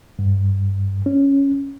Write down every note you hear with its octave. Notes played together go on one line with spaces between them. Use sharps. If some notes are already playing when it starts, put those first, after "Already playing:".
G2
C#4